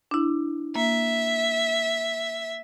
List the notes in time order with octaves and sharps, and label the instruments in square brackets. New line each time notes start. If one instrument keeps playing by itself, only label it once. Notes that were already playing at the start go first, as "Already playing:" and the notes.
[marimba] D4 E4
[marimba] A#3 [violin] E5